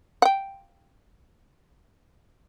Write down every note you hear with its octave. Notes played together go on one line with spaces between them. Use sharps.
F#5 G5